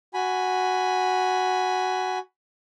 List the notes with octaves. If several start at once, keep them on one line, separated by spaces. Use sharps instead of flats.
F#4 G#5 B5